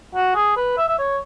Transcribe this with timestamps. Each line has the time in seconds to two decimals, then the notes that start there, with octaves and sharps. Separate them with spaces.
0.15 F#4
0.35 G#4
0.56 B4
0.78 E5
0.88 E5
0.99 C#5